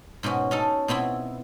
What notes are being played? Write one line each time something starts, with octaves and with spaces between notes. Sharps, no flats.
G#2 B2 C#4 F#4
C#4 D#4 A4
B2 B3 C4 E4